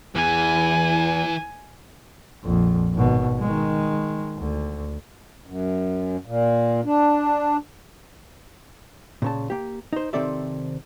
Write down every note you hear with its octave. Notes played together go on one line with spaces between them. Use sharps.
E2 E3 G#5
A#1 F2
G#1 B2
D#3 G#3
D2
F#2
A#2
D4
A#2 C#3 A5
A#3 G4
D#4 C5
C3 D#3 C4 A4 D5 E5